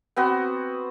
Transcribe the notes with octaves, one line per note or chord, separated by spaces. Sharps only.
B3 C4 F#4 B4